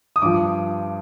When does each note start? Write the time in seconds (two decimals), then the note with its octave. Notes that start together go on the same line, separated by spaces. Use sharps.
0.16 D#6
0.22 G2 F3 D6